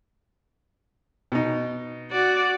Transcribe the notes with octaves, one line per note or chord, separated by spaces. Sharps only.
B2 D#4
F#4 D5